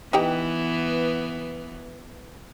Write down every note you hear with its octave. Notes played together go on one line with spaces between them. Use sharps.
E3 B3 D#4 G4 G5